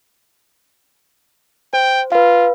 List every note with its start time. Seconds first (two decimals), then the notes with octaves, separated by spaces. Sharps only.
1.73 C5 G5
2.12 F4 B4 F5